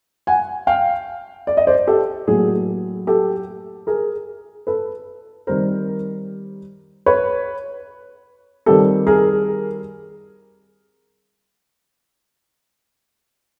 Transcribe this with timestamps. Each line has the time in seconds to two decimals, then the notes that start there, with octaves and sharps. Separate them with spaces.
0.27 F#5 G#5
0.67 F5 G5
1.47 D5
1.57 D#5
1.67 C5 D5
1.87 G4 A4
2.27 A2 F#3 A#3 G#4
3.07 G4 A4
3.87 G#4 A#4
4.67 A4 B4
5.47 D#3 G3 C4 A#4 C5
7.06 B4 C#5
8.66 D#3 G3 C4 G4 A4
9.07 G#4 A#4